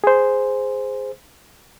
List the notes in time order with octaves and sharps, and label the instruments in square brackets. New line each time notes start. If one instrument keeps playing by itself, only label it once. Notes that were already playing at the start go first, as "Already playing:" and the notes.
[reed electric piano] G#4 C5